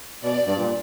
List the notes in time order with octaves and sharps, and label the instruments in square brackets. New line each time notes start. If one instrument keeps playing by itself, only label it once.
[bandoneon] B2 [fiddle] D5
[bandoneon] G2
A#2